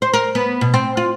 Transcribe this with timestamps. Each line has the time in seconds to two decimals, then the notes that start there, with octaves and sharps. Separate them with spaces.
0.02 C5
0.14 A#4
0.35 B3
0.61 B2
0.74 C4
0.97 F4